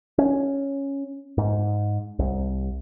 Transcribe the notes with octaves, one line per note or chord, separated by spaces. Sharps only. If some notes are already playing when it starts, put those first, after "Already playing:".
C#4
G#2
C2